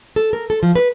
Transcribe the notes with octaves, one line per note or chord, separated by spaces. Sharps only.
A4
A#4
A4
F3
B4